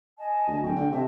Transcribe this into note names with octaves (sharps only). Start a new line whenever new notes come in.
D#5 G#5 A5
D2
D1 G5 C#6
D3
C3 D#5 E5 A5